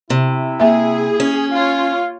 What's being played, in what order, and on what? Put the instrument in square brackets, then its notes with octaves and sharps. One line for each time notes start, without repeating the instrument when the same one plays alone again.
[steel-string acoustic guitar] C3 [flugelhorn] E4
[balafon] A#3 E5 [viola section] G#4
[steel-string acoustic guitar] C#4
[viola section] F4 C#5 [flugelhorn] F5